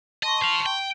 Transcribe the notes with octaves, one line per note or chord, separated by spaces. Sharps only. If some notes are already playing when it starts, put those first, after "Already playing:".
D#5 A5 C6 C#6
C5 F5
G5